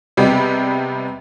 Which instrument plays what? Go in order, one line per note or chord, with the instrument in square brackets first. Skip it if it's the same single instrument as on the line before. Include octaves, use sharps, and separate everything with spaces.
[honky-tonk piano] C3 G3 G#3 B3 G4